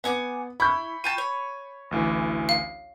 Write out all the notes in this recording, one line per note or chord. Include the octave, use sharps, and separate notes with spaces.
B3 F#5 G#5 D6
E4 B5 C#6 G6
F4 G5 A5 D#7
C#5
A1 D2 E3
F5